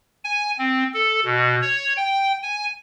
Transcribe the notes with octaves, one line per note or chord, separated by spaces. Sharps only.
G#5
C4
A4
B2
C#5
G5
G#5